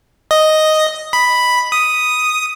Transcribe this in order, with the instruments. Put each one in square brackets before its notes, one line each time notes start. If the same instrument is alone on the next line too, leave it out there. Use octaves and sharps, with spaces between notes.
[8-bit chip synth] D#5
B5
D#6